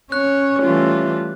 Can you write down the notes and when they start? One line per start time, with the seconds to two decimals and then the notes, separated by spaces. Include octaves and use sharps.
0.12 C#4 C#5 F#6
0.63 E3 G3 A3 F4